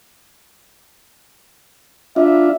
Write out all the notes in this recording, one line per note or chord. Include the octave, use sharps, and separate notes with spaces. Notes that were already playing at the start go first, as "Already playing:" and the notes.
D4 F4 E5